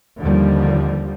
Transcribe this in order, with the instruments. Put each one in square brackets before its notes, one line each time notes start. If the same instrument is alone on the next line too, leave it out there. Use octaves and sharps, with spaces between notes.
[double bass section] D#2 D3 F3 G3